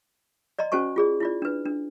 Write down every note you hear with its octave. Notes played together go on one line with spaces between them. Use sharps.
D5 D#5 A#5 C6
C#4 F#4 C5 G#5 C#6
F4 G#4 D5
E4 F4 D5
D4 B4
D4